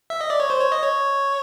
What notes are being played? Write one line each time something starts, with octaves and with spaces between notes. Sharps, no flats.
E5
D#5
D5
C#5
C5
C#5
D#5
C#5